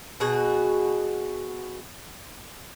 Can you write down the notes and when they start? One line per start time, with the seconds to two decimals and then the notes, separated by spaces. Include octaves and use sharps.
0.20 B2 F#4 G#4